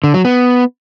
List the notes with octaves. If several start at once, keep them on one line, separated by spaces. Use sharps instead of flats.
D3
F#3
B3